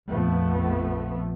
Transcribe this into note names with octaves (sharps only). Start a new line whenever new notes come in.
A#1 F2 F3 A3 B3